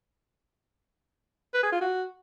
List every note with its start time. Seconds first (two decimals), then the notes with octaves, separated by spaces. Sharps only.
1.54 B4
1.63 G#4
1.72 F4
1.81 F#4